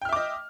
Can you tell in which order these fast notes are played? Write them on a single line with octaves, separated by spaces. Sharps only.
G5 F6 E5 D6 D#5